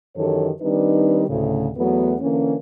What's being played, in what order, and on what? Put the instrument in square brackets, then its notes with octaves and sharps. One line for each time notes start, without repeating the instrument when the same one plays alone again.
[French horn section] F#2 D#3 E3 G4 A4 C#5
D#3 G3 C4 D4 D#4 B4
D2 A2 C#3
E2 F#3 A3 B3
D3 E3 A#3 C#4